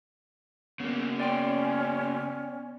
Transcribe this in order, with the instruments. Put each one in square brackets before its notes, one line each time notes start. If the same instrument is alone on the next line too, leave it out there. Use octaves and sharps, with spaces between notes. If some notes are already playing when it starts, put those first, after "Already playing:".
[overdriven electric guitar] C#3 A#3 [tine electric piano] B3
[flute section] C#4 [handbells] D5 G5 C6